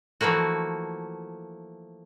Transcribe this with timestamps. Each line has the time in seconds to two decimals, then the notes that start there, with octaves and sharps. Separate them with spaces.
0.21 E3 F3 A3 A#3 F#4